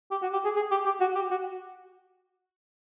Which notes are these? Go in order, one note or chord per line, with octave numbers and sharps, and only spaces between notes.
G4
F#4
G4
G#4
G#4
G4
G4
F#4
G4
F#4